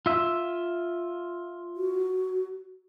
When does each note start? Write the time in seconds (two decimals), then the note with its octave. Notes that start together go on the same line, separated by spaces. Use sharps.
0.06 F4 E5
1.77 F#4